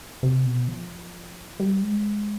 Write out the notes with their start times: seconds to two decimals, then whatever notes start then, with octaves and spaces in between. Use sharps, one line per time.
0.23 C3
0.46 B2
0.68 F3
1.60 G3
1.82 G#3